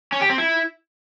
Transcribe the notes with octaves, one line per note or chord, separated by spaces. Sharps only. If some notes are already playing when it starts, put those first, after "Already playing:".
C#4
G4
C4
E4